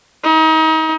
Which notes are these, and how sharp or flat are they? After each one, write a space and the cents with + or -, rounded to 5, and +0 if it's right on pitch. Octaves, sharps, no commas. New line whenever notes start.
D#4 +35